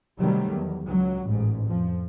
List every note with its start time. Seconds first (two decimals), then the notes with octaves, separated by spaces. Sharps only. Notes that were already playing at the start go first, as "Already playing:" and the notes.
0.19 C3 D#3 F#3 G3 A3
0.52 E2
0.86 C#2 F#3
1.27 A1 G#2
1.66 F2 F3